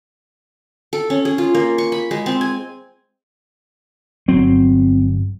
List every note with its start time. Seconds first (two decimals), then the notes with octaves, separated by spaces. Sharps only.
0.93 A4
1.10 C#4
1.25 G#4
1.38 F4
1.55 A#3
1.78 C#6
1.92 B5
2.11 G#3
2.26 C4
2.41 G#5
4.28 G1 F#3 C4